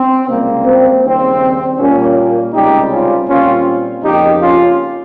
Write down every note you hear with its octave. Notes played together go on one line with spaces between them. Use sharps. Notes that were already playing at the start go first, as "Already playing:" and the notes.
Already playing: C4
C#2 C3 G3 A#3
C4
D#2 C#3 G3 C4
A#2 G3 A#3 C#4
C#2 C3 G3 C4 D#4 G4
C#4 F4
A#2 G3 C4 C#4 F4
F2 C#3 F3 A#3 D#4 G4
C#4 F4